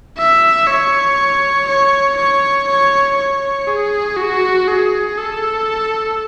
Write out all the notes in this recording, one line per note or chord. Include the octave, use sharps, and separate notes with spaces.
E5
C#5
C#5
C#5
C#5
C#5
G#4
F#4
G#4
A4